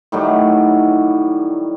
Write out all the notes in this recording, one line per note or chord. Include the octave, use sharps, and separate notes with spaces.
A2 D#3 F#3 G3